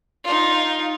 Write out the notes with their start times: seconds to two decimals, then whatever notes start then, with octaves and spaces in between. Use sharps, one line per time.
0.24 D#4 F4